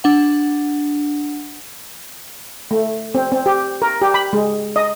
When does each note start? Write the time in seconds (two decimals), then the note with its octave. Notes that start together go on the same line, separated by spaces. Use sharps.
0.04 D4 F#5
2.71 A3
3.15 C4
3.32 C4
3.46 G4
3.82 A#4
4.01 G4
4.14 B5
4.33 G#3
4.76 D#5